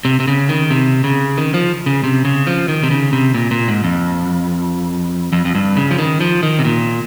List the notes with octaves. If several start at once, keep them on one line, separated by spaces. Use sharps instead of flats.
C3
C3
C#3
D#3
C3
C#3
D#3
F3
C#3
C3
C#3
F3
D#3
C3
C#3
C3
A#2
A#2
G#2
F2
F2
F2
G2
C#3
F3
D#3
F3
D#3
C3
A#2